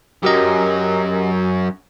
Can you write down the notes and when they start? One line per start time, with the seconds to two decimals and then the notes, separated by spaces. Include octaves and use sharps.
0.23 F#2 F#3 G4 A#4 D#5